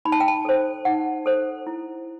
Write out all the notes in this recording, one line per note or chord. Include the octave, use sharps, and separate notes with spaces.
D#4 B5
A5
G5
A5
A4 C5
D#4 F#5
A4 C5
E4